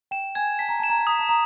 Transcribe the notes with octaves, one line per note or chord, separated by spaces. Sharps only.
G5 E7
G#5 G#6
A5 B6
A#5
A5 E7
A#5
A5
A#5 D#6
A5
A#5